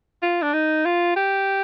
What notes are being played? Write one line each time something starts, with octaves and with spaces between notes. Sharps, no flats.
F4
D4
D#4
F4
G4